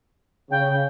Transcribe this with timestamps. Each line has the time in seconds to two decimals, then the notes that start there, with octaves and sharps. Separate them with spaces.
0.51 C#3 G5